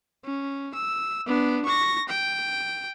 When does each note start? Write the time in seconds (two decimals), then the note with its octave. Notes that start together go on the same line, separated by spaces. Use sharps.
0.25 C#4
0.75 E6
1.27 B3 D4
1.65 C#6 A#6
2.09 G5